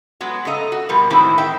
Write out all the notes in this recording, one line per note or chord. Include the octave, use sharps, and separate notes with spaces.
F#3 G#3 B3 F#4
C#3 A3 D#5 A#5
F#4
B2 F3 G3 A#4
A2 D#3 E3 G#3 C4 E4
D#3 E5 G5